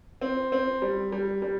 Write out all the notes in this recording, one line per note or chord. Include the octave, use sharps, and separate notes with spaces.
C4
C4
G3
G3
G3